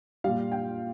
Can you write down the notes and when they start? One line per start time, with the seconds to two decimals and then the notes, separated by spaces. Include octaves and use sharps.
0.24 A#2 G3 F5
0.52 G5